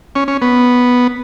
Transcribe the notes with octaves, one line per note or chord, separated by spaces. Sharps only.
C#4
C#4
B3